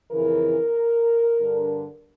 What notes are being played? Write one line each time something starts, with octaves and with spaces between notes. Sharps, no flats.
F2 C#3 E3 A#4
G2 D3